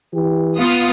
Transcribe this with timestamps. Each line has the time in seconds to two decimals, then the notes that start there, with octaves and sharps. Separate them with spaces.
0.13 E3 G4
0.58 B3 F4 D#6